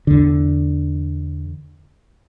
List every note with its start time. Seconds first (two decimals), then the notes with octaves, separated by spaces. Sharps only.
0.07 E2 D3